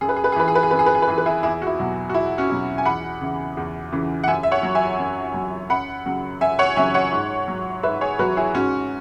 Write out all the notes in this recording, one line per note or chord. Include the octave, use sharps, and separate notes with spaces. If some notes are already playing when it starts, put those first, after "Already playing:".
F#2 G#4
B4
G#4
B4
G#4
E3 B4
G#4
B4
G#4
F#2 B4
G#4
B4
G#4
B4
E3 G#4
B4
E4 G#4
E2 E4 G#4
F#4
E4
B2 F#3
F#4
E2 E4
C#4 F#4
B2 F#3
G#5
E2 F#5 B5
C#3 E3
E2
C#3 E3
F#5
F#2 E5 G#5
E5
C#5 F#5
F#3
E5 G#5
F#2
F#3
F#2 F#5 B5
C#3 F#3
F#2 E5 G#5
C#5 F#5
C#3 F#3 E5 G#5
C#5 F#5
G#2
F#3
G#2 B4 E5
G#4 C#5
F#3 F#4 B4
E4 G#4
G#2 C#4 F#4